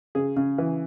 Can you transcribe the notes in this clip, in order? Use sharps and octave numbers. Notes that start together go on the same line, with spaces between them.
C#3 G#4
C#3
E3